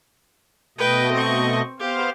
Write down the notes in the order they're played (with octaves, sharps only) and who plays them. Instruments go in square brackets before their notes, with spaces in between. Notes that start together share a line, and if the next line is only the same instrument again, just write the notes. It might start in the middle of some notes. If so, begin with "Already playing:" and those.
[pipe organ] B2 A3 D#5 [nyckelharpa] B4 G5
[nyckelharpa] C4 C#6
[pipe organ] B3 C5 F5 [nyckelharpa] G4